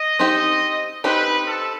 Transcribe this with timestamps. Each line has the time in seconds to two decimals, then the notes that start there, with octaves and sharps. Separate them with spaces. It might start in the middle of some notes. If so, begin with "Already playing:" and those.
Already playing: D#5
0.19 C4 D#4 G4
1.04 C4 D#4 G4 B4
1.47 A4